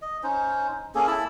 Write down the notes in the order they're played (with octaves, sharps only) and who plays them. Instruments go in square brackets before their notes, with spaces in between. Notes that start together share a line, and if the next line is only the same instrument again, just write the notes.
[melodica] D#5
C#4 D#4 C5
A#3 C#4 G#4 A4
E4 A5 B5 E6